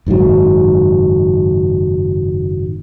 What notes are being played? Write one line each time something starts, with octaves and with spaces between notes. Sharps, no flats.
F#1 G#2 D#3 F#3